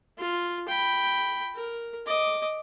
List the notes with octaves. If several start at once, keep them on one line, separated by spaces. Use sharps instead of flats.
F4
G5 B5
A#4
D#5 D6